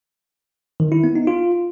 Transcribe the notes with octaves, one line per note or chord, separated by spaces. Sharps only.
D#3
E4
B3
D#4
F4